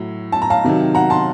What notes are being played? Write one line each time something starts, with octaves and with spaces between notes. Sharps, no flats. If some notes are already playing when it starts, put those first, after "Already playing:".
Already playing: A2 F#3
A5
A#5
F5 A5
C3 D#3 F#3
F#5 A#5
A5 C6